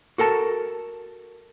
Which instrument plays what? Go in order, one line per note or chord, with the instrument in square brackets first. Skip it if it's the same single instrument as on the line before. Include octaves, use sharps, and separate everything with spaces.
[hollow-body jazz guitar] F#4 A4 A#4 A5